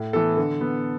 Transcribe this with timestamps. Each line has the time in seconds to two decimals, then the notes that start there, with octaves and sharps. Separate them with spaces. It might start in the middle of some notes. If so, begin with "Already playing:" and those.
Already playing: A2
0.13 E3 B3 A4
0.37 D3
0.61 B3